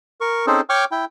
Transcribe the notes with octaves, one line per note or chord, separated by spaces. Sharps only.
A#4 C#6
C4 C#4 D#4 G#4 A4 C5
C#5 G5 C#6 D6 F6
E4 G5